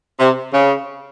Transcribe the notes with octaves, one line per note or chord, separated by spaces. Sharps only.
C3
C#3